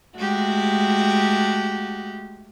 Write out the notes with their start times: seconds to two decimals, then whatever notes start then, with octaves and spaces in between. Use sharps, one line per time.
0.18 G#3 A3 F#4 G4